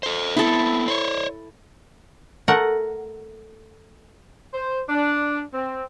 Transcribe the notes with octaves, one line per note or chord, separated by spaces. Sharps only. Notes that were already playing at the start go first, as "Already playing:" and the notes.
A4 C5
B3 C4 E4 A4
C5 C#5
A3 A#4 F#5
C5
D4
C4